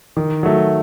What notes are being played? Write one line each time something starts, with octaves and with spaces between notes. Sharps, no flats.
D#3
F#3 A3